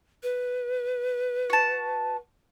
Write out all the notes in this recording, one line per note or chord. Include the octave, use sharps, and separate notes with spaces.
B4
F#4 A5